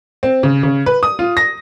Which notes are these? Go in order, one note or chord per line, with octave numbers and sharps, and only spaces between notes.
C4
C#3
C#3
B4
D#6
F4
A#6